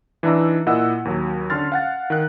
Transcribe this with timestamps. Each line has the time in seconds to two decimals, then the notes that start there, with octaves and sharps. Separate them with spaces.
0.23 E3 D4 D#4 E5 A#5 E6
0.66 A#2 E4 D#5 F#5 E6
1.05 D#2 F#3
1.50 D3 C#4 C6 F6 A6
1.72 F5 F#5 A6
2.10 D#3 F#6